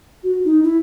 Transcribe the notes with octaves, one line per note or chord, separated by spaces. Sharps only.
F#4
D#4
E4